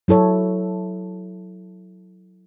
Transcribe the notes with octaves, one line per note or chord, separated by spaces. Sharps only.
F#3 E4 A4 C#5